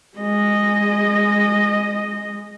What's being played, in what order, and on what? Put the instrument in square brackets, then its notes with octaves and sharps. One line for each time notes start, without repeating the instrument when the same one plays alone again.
[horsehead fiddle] G#3 D#5